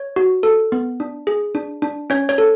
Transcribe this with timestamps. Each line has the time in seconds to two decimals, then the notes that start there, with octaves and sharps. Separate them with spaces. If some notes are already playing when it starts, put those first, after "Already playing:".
Already playing: C#5
0.16 F#4
0.43 A4
0.72 B3
1.00 D4
1.27 G#4
1.55 D4
1.82 D4
2.10 C#4 C#5
2.29 C#5
2.38 A4